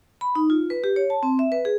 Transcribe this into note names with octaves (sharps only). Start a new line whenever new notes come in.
B5
D#4
F4
B4
G4
C#5
A5
C4
E5
B4
G#4